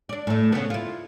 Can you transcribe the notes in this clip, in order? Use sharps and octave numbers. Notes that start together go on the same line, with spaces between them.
D4 D5
A2 A3
C#3 B3
E4 F4